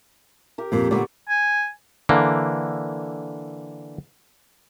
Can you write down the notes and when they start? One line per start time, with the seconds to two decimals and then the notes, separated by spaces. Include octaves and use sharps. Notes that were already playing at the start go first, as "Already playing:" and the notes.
0.58 G4 A#4
0.72 F2 A#2
0.91 A#2 D3 B3 D5 C#6
1.29 G#5
2.09 D3 E3 A#3